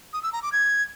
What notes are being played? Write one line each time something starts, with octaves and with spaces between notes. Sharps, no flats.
D#6
E6
A#5
D6
G#6